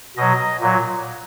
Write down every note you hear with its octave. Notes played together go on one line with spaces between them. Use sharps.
B2 F#3 D#5
A#2 F#3